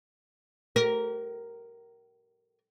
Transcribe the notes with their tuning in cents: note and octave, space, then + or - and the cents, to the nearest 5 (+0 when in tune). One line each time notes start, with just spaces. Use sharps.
G4 -40 A#4 +0